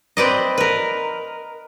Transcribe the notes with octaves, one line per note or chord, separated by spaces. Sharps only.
C4 B4 D5 D#5
A#4 B4